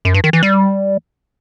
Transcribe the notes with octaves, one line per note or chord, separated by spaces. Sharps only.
F#2
G2
D#3
E3
G3